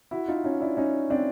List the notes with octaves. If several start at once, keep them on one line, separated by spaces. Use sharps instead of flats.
E4 F#4
D#4 F4
C#4 D#4
D4 E4
C#4 D#4
C4 D4